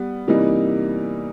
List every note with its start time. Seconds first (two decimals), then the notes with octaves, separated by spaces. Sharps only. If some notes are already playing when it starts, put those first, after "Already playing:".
Already playing: G3 B3
0.28 C3 E3 G3 A#3 D#4